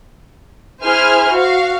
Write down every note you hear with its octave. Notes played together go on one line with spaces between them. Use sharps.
E4 G#4 C5 G#5 F6
F#4 F5